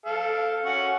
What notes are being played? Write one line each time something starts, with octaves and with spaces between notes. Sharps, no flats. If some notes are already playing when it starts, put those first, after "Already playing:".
A4 F5
C#4 F#5 C#6